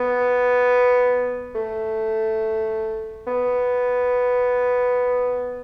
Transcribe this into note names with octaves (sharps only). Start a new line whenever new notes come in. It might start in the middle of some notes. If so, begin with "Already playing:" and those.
Already playing: B3
A3
B3